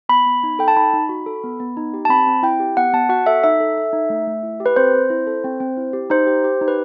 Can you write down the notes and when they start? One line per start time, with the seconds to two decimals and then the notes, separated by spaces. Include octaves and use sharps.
0.09 B3 B5
0.26 B3
0.43 D#4
0.59 A4 G5
0.68 A5
0.77 D#4 B5
0.93 D#4
1.09 F#4
1.26 A4
1.44 B3
1.60 B3
1.77 D#4
1.94 G4
2.05 A5
2.09 C4 B5
2.27 C4
2.43 E4 G5
2.60 G4
2.77 B3 F#5
2.93 B3 A5
3.09 F#4 F#5
3.26 A4 E5
3.44 D#4 E5
3.60 A4
3.77 A4
3.93 D#4
4.10 A3
4.27 A3
4.43 E4
4.60 G4
4.66 B4
4.76 C4 C5
4.94 C4
5.10 E4
5.27 A4
5.44 C4
5.60 C4
5.77 E4
5.93 G4
6.10 D#4 C5
6.27 G4
6.44 G4
6.61 D#4
6.68 B4